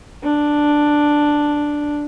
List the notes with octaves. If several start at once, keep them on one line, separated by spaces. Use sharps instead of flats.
D4